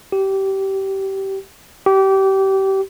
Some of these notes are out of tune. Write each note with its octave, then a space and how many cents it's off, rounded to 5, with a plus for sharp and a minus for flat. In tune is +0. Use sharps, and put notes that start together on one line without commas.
G4 -20
G4 -25